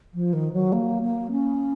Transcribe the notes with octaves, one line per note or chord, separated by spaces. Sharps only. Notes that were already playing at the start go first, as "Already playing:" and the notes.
F3
D#3
F#3
A#3
A#3
C#4